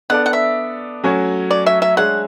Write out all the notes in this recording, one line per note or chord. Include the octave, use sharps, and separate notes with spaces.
B3 D4 A4 D5 F#5
F#5
E5
F#3 A3 C#4 F#4 C#5
D5
E5
E5
G#3 D4 G#4 C#5 E5 F#5